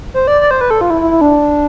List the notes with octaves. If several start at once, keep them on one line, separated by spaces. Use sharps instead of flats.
C5
D5
D5
C5
B4
A4
F4
E4
E4
E4
D4